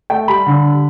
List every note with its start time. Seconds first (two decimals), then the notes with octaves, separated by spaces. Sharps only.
0.10 A3 G5
0.28 G3 B5
0.46 D3